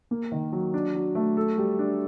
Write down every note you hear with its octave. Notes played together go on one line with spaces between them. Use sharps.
A#3
D#3
F#3
D4
F#3
A3
A4
G3
D4